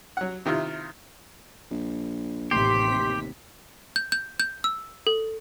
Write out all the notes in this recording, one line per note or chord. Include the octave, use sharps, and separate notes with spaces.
F#3 F#5
C3 D#3 E4 F4
A#1
A1 D#2 C3 G4 C6 B6
G6
G6
G6
E6
A4